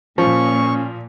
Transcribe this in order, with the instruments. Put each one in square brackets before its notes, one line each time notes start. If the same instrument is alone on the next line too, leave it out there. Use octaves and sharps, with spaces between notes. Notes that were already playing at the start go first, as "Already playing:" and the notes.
[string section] A#2 [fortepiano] F3 [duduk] C#4 [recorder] C#6